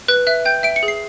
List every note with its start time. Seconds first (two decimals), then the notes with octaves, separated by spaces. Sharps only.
0.08 B4 F#6
0.27 E5 F#6
0.45 G5 G6
0.63 E5 D7
0.76 C#7
0.83 G#4
0.88 C7